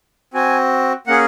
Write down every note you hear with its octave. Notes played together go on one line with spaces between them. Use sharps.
C4 F#4 G#5
A#3 C#4 G#4 F#5